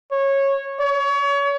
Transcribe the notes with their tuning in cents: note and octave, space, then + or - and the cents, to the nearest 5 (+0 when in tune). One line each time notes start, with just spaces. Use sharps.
C#5 -15
C#5 +30